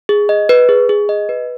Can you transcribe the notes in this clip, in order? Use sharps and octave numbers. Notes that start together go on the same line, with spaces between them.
G#4
D#5
B4
G#4
G#4
D#5
B4